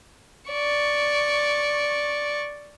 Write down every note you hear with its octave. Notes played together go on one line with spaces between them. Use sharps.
D5 C#6